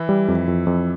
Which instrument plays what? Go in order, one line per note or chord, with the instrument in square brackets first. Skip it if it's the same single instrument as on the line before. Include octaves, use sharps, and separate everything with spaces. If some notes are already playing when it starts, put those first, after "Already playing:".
Already playing: [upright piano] E3 E4
[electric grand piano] G3
F2
F2
F2